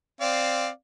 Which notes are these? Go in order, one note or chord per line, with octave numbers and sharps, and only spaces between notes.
C4 D5 F5